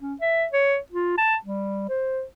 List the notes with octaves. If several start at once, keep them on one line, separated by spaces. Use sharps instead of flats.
C#4
E5
C#5
F4
A5
G3
C5